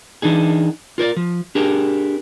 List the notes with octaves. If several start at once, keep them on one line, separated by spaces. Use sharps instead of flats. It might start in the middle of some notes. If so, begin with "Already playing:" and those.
E3 D4 D#4 G#4
F4 A#4 C#5 D5
F3
D4 G4 G#4 A#4